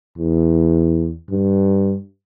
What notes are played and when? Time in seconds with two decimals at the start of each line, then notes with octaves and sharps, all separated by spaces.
0.18 E2
1.30 G2